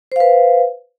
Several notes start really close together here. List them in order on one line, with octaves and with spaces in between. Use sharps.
C5 F5 B4